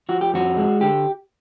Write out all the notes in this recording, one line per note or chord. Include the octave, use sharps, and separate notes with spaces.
F3 F#4
G4
F2 F#4
G#3
D3 G4